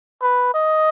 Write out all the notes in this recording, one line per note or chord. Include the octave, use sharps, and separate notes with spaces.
B4
D#5